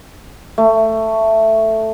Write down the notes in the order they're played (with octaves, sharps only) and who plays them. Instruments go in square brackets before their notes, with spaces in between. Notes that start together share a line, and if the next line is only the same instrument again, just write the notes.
[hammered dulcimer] A3